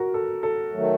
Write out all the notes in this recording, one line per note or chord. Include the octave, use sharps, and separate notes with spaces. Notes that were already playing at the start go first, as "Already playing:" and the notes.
Already playing: F#4 A#4
A4
A4
D#3 F#3 A3